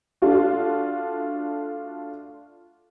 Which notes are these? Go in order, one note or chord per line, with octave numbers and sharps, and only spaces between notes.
A3 D4 F4 F#4